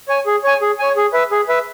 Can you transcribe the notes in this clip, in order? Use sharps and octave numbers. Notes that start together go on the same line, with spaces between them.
C#5 G#5
G#4
C#5 G#5
G#4
C#5 G#5
G#4
B4 E5
G#4
B4 E5